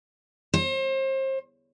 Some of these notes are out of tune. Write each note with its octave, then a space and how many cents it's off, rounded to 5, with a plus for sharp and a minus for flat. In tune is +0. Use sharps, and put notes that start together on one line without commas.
C5 +35